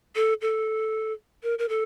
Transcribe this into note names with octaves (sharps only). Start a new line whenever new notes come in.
A4
A4
A#4
A#4
A4